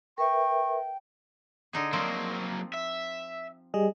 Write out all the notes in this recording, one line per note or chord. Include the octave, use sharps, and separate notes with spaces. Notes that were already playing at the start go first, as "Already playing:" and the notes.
A#4 B4 E5 G5 C#6
D3 D#4 G#4
F3 F#3 A#3 C4 D#4
E5
G3 G#4 D#5